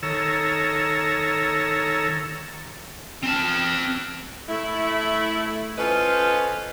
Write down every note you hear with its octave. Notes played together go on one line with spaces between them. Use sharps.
D#3 A4 C#5 A#5 E6
C4 A5
A3 E4 E5
C#4 F4 A4 B4 C5 D#5